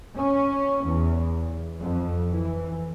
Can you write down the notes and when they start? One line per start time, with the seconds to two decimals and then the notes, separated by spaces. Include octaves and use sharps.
0.17 C#4
0.86 E2
1.81 F2
2.32 E3